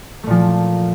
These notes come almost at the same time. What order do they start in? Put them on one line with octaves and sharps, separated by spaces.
A3 A#2 F3